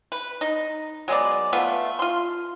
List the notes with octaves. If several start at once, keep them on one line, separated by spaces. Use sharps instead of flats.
B4
D#4
F#3 G#3 B3 D5
A3 B3 F4 B4
F4 C6